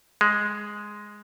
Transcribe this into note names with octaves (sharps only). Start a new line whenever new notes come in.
G#3